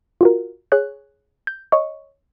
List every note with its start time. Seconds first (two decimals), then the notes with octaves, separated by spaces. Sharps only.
0.21 F4 F#4 A#4
0.72 G#4 C#5 F#6
1.47 G6
1.72 C#5 D#5 C#6